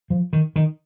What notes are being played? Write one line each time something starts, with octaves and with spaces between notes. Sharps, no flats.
F3
D#3
D#3